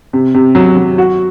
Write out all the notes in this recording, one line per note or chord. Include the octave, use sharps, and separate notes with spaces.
C3
C3
F#3
F#3
F#4